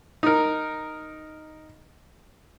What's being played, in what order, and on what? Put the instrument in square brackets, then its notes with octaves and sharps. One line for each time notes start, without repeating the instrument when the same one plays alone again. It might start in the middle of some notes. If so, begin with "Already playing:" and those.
[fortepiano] D#4 A#4